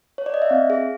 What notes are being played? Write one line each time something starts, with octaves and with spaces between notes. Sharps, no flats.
C#5
D5
D#5
E5
C4 F5
G#4